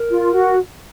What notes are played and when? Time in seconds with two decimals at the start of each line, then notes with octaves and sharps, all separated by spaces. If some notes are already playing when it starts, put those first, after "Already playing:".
Already playing: A#4
0.11 F4
0.34 F#4